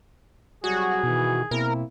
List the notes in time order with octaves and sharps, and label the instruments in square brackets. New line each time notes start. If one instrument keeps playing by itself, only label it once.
[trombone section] C2 F#3 G3 [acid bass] F#4 [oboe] G#4
[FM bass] B2 [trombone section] D#3 E3
[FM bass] B2 [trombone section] A#3 C4 E4 [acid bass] A#4